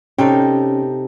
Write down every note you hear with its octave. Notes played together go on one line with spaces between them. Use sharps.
C3 C#4 D#4 A4 G5